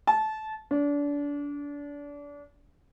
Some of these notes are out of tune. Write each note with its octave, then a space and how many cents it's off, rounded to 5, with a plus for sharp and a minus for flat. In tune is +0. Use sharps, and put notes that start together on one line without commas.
A5 -20
D4 -30